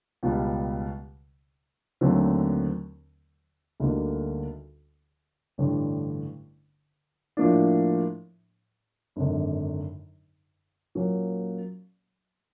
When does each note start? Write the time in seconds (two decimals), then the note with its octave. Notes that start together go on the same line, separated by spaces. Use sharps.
0.23 C#2 B2 G3
2.01 D#2 D3 F#3 A3 C4
3.80 D2 D3 G3 A#3 D#4
5.58 A1 G2 D3 G3
7.37 A2 F3 A#3 D4
9.16 G#1 F#2 D3
10.95 A#2 F#3 A#3 C#4